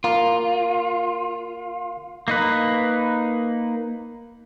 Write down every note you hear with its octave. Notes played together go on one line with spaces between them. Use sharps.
A#3 F4
A#3 D#4 B4